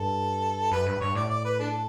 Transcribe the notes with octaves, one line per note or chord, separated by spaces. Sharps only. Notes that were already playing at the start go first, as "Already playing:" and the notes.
Already playing: G2 A4
F#2 B4
G2 B4
G2 C#5
A2 D5
D5
B4
D4 A4